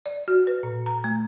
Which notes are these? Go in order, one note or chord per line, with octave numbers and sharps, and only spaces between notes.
D5
F#4
B4
A#2
A#5
A3